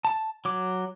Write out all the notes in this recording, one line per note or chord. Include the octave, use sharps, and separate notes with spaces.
A5
F#3 D6